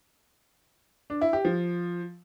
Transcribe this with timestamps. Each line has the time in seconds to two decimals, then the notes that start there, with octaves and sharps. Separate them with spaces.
1.10 D4
1.21 E4
1.33 G4
1.45 F3